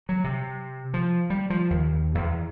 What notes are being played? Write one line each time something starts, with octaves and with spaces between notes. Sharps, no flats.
F#3
C3
F3
G3
F3
D#2
E2